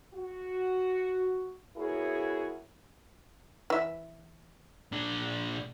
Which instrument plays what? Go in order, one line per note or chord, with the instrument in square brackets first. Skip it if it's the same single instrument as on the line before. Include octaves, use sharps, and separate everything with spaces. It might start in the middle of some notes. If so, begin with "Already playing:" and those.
[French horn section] F#4
B3 E4 F#4 G#4 A#4 C#5
[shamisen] E3 E5
[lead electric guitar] A#2 D4